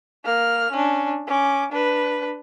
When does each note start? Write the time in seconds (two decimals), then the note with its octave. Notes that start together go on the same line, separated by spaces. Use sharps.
0.25 A#3 F6
0.72 C#4 D4
1.27 C#4 D6
1.72 D4 B4